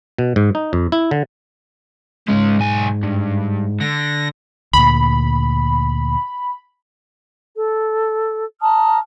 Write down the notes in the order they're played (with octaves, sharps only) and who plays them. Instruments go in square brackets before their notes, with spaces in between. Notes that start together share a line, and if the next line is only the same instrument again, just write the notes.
[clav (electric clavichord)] B2
G#2
D#4
F2
E4
D3
[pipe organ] G#2 [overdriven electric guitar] G#3 C#4
[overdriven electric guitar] B1 G#5
G2
[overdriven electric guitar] D3 [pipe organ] A#6
[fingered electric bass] D2 A#2 [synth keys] B5
[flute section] A4
A5 A#5 D#6 F6